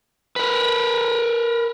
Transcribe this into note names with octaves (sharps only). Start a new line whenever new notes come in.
A#4 B4